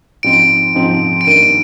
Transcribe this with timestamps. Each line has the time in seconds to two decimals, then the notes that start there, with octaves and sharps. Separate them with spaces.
0.23 G#2 F3 C4 D#4 D7
0.75 G#2 F3 C4 D#4
1.21 D7
1.27 G2 D#3 A#3 D#7